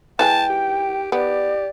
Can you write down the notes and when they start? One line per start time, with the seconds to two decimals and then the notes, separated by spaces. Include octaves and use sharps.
0.19 E3 F#3 G#3 G5 A5
0.50 G4
1.12 B3 G4 D5